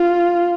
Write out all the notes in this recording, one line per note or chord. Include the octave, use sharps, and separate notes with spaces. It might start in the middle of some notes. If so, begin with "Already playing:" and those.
Already playing: F4